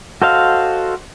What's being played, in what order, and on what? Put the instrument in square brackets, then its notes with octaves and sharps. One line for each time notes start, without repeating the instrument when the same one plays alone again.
[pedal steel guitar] F#4 A4 C5 D#5 F5